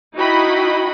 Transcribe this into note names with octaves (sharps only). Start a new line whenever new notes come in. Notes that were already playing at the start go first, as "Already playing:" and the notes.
D#4 E4 F#4 D#5 G5 B5